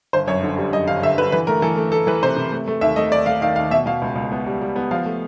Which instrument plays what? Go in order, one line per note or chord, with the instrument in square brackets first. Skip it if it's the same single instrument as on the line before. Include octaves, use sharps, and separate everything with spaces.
[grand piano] G1 C5
F#2 C#5
D3
G3
F#2 D#5
G1 F5
D3 E5
D3 B4
E3 B4
A3 A#4
E3 A4
A3
A3 A4
E3 B4
C3 C5
C3
A3
A3
D#2 E5
A3 D#5
D#2 D5
A3 F5
D#3 F5
D#2 F5
B2 E5
B2 F5
C#2
C#2
B3
G3
G3
B3
F3 F5
A3